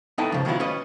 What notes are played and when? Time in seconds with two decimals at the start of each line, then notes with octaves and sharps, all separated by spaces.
0.18 B3 D#4 E4 A4 G5 A5
0.32 C#3 F3
0.45 D#3 F#3 B3 E4 F4
0.60 C#4 B4 D#5